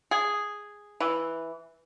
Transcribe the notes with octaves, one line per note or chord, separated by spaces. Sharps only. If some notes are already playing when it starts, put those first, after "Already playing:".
G#4
E3